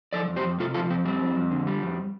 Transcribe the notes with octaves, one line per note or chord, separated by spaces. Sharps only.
F3 A4 D5
F2
G4 C5
F2
C3 F4 A4
F3 F4 A4
F2 C4
G3 C4
F2
F2
D3
G3
F2